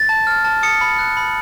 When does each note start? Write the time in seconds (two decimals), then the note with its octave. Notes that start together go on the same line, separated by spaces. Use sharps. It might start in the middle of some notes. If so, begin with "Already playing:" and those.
Already playing: A6
0.09 A5
0.27 F6
0.44 A5
0.63 D#6 C#7
0.81 B5
0.99 F#6
1.17 B5